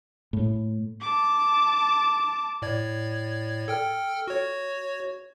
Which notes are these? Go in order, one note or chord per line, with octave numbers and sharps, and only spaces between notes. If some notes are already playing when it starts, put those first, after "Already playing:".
A2
A5 D6
A2 D5 G#6
A4 G5 F6
F#4 C#5